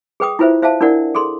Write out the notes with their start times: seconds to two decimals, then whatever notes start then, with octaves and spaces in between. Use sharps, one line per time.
0.20 G#4 B4 G5 D#6
0.39 E4 F4 B4 C5 E5
0.62 C5 E5 F5 A5
0.81 D4 E4 A#4 D5 F#5
1.15 G#4 A4 C6